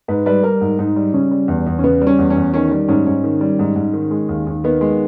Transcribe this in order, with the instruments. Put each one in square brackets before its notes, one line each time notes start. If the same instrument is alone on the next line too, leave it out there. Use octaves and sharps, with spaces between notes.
[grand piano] G#2 B4
G3 B4
G3 A#4
G#2
G#2 D#4
G3
C#3 C#4
G3
E2
E2
C#4
C#3 B3
G3
C#4
E2
C#4
E2
D#3 C#4
G3
G#2 C#4
G#2 C#4
D#3
G3
G#2
G#2
D#3
G#3
D#2
D#2
D#3 B3
G#3